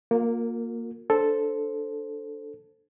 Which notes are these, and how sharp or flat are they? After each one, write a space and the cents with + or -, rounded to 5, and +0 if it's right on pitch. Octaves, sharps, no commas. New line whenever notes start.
A#3 +0 F4 +40 A#4 -25
D4 +0 A4 +0 C5 +0